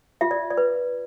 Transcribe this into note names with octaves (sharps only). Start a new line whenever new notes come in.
F4 E5
D5
D5
B4